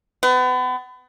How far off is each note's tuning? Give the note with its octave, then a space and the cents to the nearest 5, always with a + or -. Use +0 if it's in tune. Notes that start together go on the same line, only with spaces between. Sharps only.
B3 +35